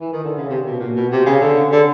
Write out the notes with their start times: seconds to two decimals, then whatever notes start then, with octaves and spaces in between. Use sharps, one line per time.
0.00 E3
0.13 D#3
0.24 D3
0.37 C#3
0.49 C3
0.66 B2
0.80 A#2
0.96 B2
1.11 C3
1.26 C#3
1.41 D3
1.72 D3